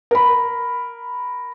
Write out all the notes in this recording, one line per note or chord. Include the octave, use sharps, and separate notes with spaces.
A#4 B5